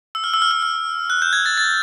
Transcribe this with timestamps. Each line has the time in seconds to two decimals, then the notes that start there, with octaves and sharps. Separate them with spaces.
0.15 E6
0.24 F6
0.34 E6
0.42 F6
0.51 E6
0.62 F6
1.10 F#6
1.22 G6
1.33 G#6
1.46 A6
1.58 A6